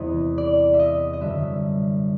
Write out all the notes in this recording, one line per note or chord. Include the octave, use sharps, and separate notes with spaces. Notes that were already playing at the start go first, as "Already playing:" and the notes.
Already playing: E2 C3 E3 G#3 D#5
D5
E5
D#5
D#5
F#2 D3 G3 E5